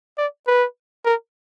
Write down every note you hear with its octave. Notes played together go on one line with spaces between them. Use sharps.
D5
B4
A#4